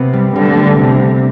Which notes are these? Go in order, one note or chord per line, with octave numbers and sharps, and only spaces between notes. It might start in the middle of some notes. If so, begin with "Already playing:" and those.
Already playing: C3 B3
G3
D3 G3
A3
G3
C3